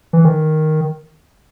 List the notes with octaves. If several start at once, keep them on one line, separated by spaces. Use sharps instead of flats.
E3
D#3